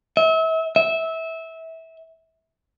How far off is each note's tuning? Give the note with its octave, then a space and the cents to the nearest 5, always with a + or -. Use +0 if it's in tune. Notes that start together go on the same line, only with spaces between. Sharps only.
E5 -35
E5 -20